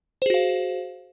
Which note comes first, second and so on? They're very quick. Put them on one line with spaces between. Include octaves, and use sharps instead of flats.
C5 G#4 F#4 F5